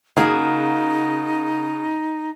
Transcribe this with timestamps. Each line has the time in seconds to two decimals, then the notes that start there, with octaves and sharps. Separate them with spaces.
0.17 C#3 A#3 D#4 F#4 G#4